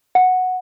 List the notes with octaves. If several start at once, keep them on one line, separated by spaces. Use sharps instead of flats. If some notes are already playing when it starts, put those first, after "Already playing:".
F#5